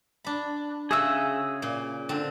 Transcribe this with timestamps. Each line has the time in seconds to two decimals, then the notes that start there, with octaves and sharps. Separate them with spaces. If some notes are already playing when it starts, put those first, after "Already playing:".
0.25 D4 B5
0.91 C#3 F#4 G#4 E5 E6
1.62 A#2
2.09 D3 C4